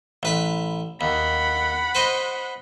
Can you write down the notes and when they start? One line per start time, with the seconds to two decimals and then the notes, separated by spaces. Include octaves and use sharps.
0.23 A1 B4 B5
1.01 D#2 F#5 B5
1.95 B4 C5 D#5